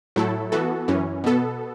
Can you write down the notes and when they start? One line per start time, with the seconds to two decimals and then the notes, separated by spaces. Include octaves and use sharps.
0.16 A2 F#3 A3 E4 A4
0.52 E3 B3 F#4 A4
0.88 F#2 E3 C#4
1.24 B2 B3 A4